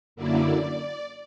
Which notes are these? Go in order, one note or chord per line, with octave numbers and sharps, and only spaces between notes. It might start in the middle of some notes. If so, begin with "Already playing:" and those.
F#2 D3 F#3 A#3 E4 D5